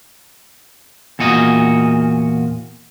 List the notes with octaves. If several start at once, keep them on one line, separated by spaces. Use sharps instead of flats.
E2 A#2 F#4 D#5